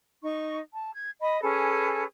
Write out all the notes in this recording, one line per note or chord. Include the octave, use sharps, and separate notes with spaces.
D#4 C#6
A5
G#6
D#5 B5
C#4 G#4 A4 B4